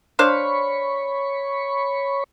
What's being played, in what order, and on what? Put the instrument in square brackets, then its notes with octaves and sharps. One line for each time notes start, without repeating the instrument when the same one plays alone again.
[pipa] D4 C5 F5 [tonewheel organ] C#5 B5 C#6